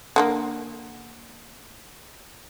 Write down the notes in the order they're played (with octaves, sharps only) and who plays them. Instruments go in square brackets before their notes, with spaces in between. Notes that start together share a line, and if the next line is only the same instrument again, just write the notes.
[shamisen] D3 F3 A#3